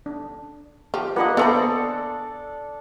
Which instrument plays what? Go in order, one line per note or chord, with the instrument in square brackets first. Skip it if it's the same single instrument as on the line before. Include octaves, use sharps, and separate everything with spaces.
[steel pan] D4
[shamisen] F3 [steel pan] G4
[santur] A#3 D4 D#5 [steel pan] F4 B4 F#5
[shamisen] D3 F4 B5 [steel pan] B3 G#4 C5 [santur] A4 D5